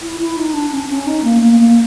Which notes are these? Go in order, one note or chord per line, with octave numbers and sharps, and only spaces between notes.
E4
E4
D#4
D4
C#4
C#4
D#4
A#3
A#3
A#3